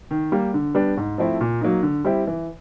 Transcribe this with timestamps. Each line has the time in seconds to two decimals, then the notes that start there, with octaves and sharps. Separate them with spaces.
0.11 D#3
0.32 G3 A#3
0.54 D3
0.75 G3 B3 D4
0.97 G#2
1.18 F3 A3 C4 E4
1.41 A#2
1.61 F#3 A#3 D#4
1.83 D3
2.04 G3 C4 E4 G4
2.27 E3